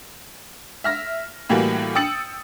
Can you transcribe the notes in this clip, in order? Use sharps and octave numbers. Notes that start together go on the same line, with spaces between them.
E5 F6 A#6
A2 E3 G3 A#3 F#4
G5 D#6 E6 A6 C#7 F#7